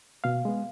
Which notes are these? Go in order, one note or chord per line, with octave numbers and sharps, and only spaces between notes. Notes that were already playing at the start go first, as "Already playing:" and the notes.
B2 F5
G#3 B3